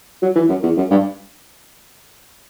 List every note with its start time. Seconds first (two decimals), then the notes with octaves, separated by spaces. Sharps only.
0.22 F#3
0.36 E3
0.49 F#2
0.63 E2
0.77 F#2
0.91 G2